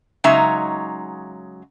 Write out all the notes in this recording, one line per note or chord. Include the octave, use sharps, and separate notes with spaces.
C#3 F#3 G#3 D#4 E5 A#5